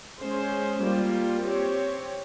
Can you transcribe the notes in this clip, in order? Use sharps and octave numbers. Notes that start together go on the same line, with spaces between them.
G#3 C#4 G#4 C5
G3 A#3 F4
C4 G4 C#5